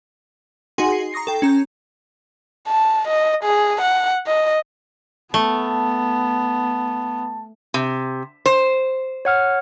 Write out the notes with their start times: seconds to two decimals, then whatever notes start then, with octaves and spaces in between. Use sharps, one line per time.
0.78 D#4 F#4 G#4 F#5 G#5 C6
0.92 C7
1.13 A#5 C#6 D#6 A#6 C7
1.27 A4 G5
1.42 C#4 A#5 G6
2.68 A5
3.08 D#5
3.44 G#4
3.81 F#5
4.27 D#5
5.34 A3 B3 A5
7.74 C3
8.46 C5
9.25 C#5 F#5 F6